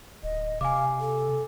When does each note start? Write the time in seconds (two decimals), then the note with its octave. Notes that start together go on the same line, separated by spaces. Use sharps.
0.23 D1 D#5
0.61 C3 F5 G#5 D6
1.00 A4